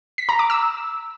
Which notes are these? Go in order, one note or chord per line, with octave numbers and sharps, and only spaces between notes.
B6
A#5
D6
E6